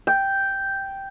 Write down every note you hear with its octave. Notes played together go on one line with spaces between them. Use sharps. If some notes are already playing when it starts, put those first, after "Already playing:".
G5